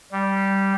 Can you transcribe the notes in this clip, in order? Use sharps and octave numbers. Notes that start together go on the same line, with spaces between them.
G3